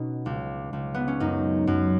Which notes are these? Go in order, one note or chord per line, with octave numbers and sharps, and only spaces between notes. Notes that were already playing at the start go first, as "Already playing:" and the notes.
Already playing: B2 C#4 D#4
C#2
C#2
B3
C#4
F#2 D#4
F#2